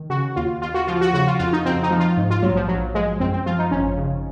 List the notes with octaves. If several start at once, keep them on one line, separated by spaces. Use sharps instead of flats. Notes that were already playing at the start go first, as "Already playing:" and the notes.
Already playing: D#3
C#3 F#4
D#2 F4
D#2 F4
F#4
F3 F4
F#4
C#3 F#4
F4
F2 F4
D#4
F2 C4
D#4
F3
F4
G#2
F4
A#1 F#3
F3
A#1 F#3
F3 G#3
F#2 C4
C4
F3 F4
D#4
G#1 C#4
C#3